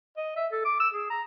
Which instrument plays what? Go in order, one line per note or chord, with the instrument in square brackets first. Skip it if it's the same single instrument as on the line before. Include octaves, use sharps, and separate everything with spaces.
[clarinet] D#5
E5
A4
D6
E6
G#4
A#5